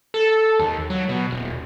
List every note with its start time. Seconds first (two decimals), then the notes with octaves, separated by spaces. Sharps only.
0.14 A4
0.60 D#2
0.90 F#3
1.09 B2
1.31 D#1